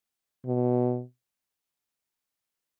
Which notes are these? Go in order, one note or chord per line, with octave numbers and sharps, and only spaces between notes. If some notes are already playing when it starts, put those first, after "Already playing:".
B2